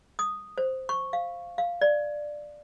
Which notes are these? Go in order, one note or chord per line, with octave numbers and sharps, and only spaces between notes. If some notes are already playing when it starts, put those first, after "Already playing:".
D#6
C5
C#6
F5
F5
D5